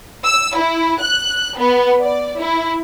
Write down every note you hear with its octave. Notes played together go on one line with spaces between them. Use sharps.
E6
E4
F#6
B3
D5
E4